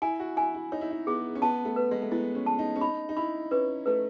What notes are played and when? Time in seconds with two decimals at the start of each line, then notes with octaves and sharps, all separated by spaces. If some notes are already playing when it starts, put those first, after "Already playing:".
0.02 E4 G#5
0.20 F#4
0.37 E4 G#5
0.54 E4
0.72 D#4 C#5
0.81 E4
0.91 D#4
1.07 B3 G#4
1.35 C#4
1.42 B3 A5
1.65 A3
1.76 B4
1.91 G#3
2.02 A3
2.11 B3 E4
2.35 C#4
2.46 A5
2.59 D#4
2.76 C#4
2.81 D#4 B5
3.09 D#4
3.17 E4 B5
3.51 C#4 B4
3.86 A3 B4